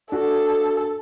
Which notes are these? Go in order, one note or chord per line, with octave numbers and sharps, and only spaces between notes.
D4 F#4 A4